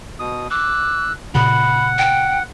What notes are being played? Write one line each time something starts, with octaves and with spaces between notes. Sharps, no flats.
B2 D#6
D6 E6 F#6
A#2 C#3 F#5 B5
G5